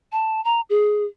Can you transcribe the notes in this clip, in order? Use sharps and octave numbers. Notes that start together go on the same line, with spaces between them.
A5
A#5
G#4